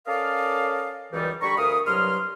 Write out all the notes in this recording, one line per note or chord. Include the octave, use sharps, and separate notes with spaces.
C#4 A4 A#4 D5 D#5 F5
C#2 F#2 E3 G3 D#4 D5
D3 G3 A#5 B5 C#6
D2 A#4 F5 D#6
C2 G2 F#3 C6 F6